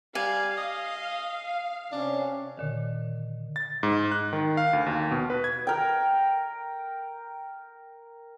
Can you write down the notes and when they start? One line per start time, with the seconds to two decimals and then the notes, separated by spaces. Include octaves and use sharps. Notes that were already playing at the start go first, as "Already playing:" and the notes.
0.15 G3 F5 G#5
0.57 D#5
1.92 C3 C#4 D4
2.57 A#2 D3 D#3
3.56 A6
3.83 G#2
4.12 F#6
4.33 D#3
4.57 F5
4.73 D2
4.86 D#2
5.11 B2
5.30 B4
5.44 G#6
5.67 A#4 G5